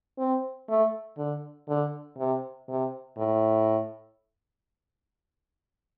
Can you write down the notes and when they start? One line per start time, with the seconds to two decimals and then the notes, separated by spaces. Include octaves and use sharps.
0.18 C4
0.69 A3
1.17 D3
1.68 D3
2.18 C3
2.68 C3
3.18 A2